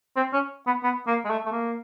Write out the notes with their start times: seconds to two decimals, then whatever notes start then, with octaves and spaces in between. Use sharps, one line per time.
0.16 C4
0.33 C#4
0.67 B3
0.84 B3
1.07 A#3
1.25 G#3
1.30 A3
1.46 A3
1.52 A#3